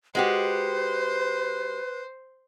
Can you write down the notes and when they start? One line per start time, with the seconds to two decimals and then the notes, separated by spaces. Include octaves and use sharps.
0.15 G#3 F#4 G4 B4 C5